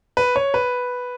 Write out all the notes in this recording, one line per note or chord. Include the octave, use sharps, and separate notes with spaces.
B4
C#5
B4